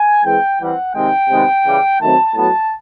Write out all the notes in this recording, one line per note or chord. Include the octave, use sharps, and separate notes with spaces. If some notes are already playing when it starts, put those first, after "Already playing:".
Already playing: G#5
E3 G#3 C4 G5
E3 G3 C4 F#5
C3 D#3 G#3 C4 G5
C3 D#3 G#3 B3
C#3 E3 G3
D#3 F#3 A3 C4 A5
A2 F#3 B3 A5